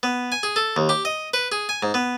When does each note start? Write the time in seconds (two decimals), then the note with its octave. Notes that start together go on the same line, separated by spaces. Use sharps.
0.03 B3
0.32 G#5
0.43 G#4
0.56 A4
0.76 D#2
0.89 G4
1.05 D#5
1.34 B4
1.52 G#4
1.69 G#5
1.83 G#2
1.94 B3